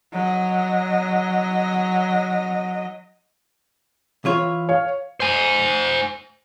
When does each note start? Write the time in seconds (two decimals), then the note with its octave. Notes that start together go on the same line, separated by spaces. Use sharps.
0.12 F#3 D#5
4.25 E3 F4 C#5
4.69 C#5 F5
5.20 C5 G#5